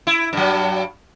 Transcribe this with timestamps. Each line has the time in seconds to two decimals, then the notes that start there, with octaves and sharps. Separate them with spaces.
0.07 E4
0.33 G2 F#3